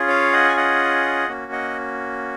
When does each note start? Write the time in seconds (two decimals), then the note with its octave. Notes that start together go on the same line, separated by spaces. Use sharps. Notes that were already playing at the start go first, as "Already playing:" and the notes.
Already playing: C#4 F4 G#4
0.08 C#5 F5
0.33 D#5 F#5
0.49 G#5
0.57 D#5 F#5
1.29 A#3 C#4 F#4
1.52 D#5 F#5